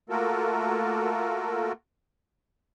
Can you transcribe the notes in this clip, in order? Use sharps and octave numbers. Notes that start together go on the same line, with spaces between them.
A3 A#3 F4 F#4 A4 A#4